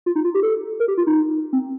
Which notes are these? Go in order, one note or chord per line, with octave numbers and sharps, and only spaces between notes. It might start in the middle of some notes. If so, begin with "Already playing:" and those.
F4
D#4
F4
G4
A4
A#4
G4
F4
D#4
C4